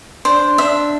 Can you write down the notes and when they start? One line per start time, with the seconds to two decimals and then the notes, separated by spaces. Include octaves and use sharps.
0.25 D4 C5
0.58 D4 E5